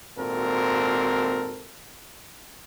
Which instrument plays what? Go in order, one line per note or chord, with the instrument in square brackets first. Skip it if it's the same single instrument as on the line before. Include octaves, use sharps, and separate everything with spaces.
[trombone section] G#1 A#2 C4 F#4 A4 A#4